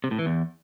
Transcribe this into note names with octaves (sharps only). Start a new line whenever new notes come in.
C3
A2
E3
E2